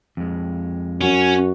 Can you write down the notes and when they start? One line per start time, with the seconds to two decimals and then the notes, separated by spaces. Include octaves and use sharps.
0.17 F2 G#3
1.01 F#2 C#4 F#4